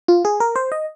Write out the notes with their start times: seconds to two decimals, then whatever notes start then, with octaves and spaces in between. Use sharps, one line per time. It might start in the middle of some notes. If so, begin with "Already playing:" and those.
0.08 F4
0.25 G#4
0.40 A#4
0.56 C5
0.72 D#5